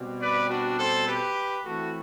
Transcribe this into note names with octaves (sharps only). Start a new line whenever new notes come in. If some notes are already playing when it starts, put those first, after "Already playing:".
Already playing: B2 G3 C4
B4 D5
D4 F#4
A4 C5
G4 B4
E3 A3 C4 F#4 A4